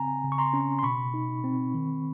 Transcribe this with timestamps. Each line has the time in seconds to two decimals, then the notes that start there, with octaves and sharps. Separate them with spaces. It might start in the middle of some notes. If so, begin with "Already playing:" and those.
Already playing: C#3 C4 G#5 A#5
0.24 C#3
0.32 C#6
0.38 A#5 C6
0.53 C#4
0.79 C6
0.83 B2 B5 C#6
1.14 D#4
1.44 C4
1.74 D#3